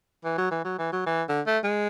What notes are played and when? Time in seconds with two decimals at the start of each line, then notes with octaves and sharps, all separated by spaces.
0.24 E3
0.38 F#3
0.51 E3
0.65 F#3
0.79 E3
0.93 F#3
1.06 E3
1.29 D3
1.46 A3
1.64 G#3